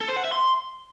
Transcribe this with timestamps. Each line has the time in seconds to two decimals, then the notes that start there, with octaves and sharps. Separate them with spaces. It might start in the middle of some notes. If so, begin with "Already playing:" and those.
0.01 A4
0.09 C5
0.17 F#5
0.25 E5
0.33 C6